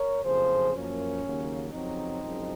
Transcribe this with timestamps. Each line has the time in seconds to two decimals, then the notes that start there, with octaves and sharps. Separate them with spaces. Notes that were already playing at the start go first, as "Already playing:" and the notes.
Already playing: A#4 C#5
0.23 F#1 F2 C#3 F3 G#4 C5
0.73 F#2 F3 A#3 C#4
1.23 D#2 C#3 F#3 A#3
1.72 F2 C#3 F#3 C4 D#4
2.22 F#1 F#2 F3 G#3